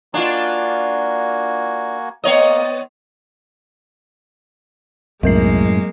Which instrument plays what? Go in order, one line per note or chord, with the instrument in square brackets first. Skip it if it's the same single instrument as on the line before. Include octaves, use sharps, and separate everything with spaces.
[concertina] A#3 F#4 G#5 [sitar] D4 F4
[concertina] A#3 [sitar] B3 C#5 D#5
[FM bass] C2 [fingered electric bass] F#2 A2 [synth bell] F#3 A#4 C7 [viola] G#3 A#3